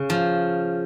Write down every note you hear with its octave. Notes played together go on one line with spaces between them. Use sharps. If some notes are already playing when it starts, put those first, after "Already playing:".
Already playing: C#3
F3